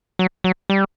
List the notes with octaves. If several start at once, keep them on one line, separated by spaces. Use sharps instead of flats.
F#3
F#3
G3